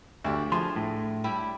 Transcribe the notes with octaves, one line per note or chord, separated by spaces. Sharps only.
D2 D4 G4
F3 G#4 C6
A2
G3 E4 G4